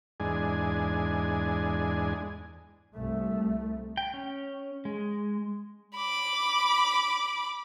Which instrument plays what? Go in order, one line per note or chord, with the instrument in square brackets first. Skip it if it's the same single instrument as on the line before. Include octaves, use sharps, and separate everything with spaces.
[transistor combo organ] E2 G#2 G#3 D4 G#5
[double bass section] C2 A3
[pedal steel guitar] G5
C#4
G#3
[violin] B5 D6